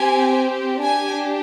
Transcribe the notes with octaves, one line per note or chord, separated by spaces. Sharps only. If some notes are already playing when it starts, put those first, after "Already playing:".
Already playing: C4 G4 G#5
D4 G4 G#5